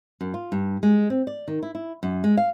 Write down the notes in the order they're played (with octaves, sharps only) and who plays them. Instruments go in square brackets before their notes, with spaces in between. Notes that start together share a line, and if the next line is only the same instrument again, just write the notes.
[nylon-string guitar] F#2
F4
G2
G#3
C4
D5
D#3
E4
E4
F#2
G#3
F5